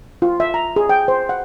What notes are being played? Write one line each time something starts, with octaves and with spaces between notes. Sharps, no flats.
F4
E5
A#5
G#4
G5
C5
F#5